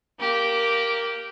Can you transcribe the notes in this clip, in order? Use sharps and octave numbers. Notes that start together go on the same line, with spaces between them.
A#3 G4